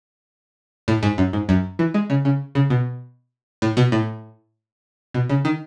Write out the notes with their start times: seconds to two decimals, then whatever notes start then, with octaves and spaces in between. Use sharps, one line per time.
0.88 A2
1.03 G#2
1.18 F#2
1.33 G#2
1.49 F#2
1.79 E3
1.94 G#3
2.10 C#3
2.25 C#3
2.55 C#3
2.70 B2
3.62 A2
3.77 B2
3.92 A2
5.14 B2
5.29 C#3
5.45 D#3